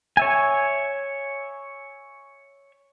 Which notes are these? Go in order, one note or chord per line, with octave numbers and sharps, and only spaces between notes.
C#5 E5 G#5